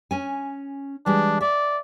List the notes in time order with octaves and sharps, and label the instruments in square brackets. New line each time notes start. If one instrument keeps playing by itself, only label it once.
[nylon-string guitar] C#4 G#5
[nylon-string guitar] E3 G3 G#3 [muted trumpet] D4
[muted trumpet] D5 [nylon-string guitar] E5